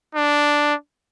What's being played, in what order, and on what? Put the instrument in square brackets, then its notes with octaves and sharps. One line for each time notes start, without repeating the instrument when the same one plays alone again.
[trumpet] D4